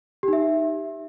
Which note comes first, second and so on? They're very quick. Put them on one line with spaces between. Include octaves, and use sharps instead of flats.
G4 D#4 E5